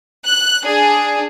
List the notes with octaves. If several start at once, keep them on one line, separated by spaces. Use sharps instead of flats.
F#6
D4 G#4